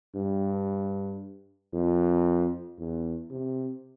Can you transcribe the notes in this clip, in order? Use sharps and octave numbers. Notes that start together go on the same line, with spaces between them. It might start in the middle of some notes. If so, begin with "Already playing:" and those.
G2
F2
E2
C3